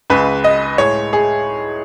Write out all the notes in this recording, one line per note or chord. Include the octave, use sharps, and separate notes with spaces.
C#2 C#3 G#3 B4
D#5
A2 G#3 C#5
G#4